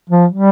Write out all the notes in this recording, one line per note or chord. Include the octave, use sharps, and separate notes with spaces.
F3
G3